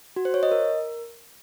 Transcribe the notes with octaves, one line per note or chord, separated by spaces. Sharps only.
F#4
C5
C#5
D#5
A#4